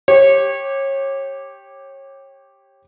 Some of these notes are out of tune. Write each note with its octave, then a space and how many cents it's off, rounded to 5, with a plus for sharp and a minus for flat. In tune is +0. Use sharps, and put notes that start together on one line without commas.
G4 +0 C#5 -25